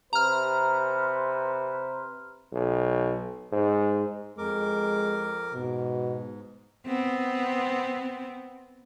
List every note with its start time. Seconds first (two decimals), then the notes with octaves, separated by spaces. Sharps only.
0.13 C3 B4 C5 A#5 F6
2.52 B1
3.52 G#2
4.38 F2 G#3 A#4 D6
5.54 G#2 B2
6.86 B3 C4